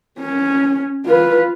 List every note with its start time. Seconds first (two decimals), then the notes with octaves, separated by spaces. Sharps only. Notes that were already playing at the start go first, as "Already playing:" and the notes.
0.20 C#4
1.05 F4 B4